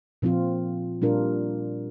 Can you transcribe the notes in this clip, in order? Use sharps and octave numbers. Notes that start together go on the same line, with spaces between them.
A#2 F3 C4 F4
A#2 G3 D4 F4 A#4